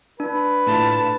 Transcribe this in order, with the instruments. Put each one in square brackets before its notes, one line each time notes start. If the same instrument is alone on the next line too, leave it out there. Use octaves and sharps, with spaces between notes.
[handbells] D4 [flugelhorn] B4
[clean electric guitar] A2 A3 F4 [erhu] A5